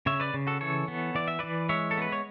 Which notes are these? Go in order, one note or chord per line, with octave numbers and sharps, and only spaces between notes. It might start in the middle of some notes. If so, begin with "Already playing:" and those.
C#3 C#5 E5
B4 D5
C#3
F#4 A4
E3 A4 C#5
B3
E3 D5
E5
E3 B4 D5
G#3 C#5 E5
A4
B3 B4
C#5